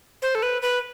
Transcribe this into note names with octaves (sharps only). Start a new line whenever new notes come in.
C5
A4
B4
B4